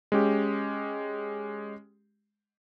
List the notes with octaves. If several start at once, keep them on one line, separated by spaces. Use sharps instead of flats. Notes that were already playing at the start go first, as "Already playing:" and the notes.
G#3 C#4 G4